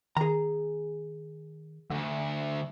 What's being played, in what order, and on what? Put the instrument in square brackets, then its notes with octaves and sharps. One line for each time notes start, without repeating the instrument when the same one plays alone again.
[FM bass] D#3 [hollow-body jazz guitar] G#4 A#5
[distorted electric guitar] D2 [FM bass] D3